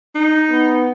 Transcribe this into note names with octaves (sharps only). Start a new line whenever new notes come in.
D#4
B3